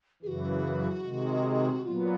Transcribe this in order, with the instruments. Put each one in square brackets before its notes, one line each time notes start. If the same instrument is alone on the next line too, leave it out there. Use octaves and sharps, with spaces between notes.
[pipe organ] F#2 C#3 E3 [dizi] F#4 G#4
[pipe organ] C3 D#3 G#3
[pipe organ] A#2 F#3 B3 [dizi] F4